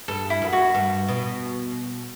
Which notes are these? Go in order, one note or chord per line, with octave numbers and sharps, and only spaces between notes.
G2 A4
E4
F#2
F#4
G2
B2